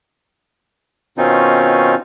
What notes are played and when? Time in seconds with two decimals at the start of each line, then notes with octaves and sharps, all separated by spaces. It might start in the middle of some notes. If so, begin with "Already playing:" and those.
1.18 B2 D#3 C4 C#4 D#4 F4